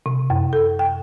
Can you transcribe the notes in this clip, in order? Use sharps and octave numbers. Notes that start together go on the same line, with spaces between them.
C3
F#2
A4
G5